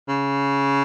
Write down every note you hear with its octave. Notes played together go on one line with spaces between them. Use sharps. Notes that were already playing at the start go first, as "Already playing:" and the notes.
C#3